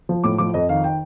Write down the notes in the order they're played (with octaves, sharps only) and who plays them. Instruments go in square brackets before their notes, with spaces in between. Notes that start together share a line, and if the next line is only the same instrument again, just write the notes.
[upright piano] F3
A2 D6
F3 D6
F2 D#5
D#3 F5
G5